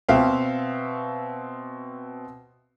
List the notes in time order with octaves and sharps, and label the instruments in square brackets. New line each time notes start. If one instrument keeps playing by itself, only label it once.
[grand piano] B2 C4 E5 F5